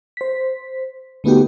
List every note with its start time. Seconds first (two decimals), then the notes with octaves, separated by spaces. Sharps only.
0.17 C5 B6
1.24 D3 A3 B3 D#4 F#4 G4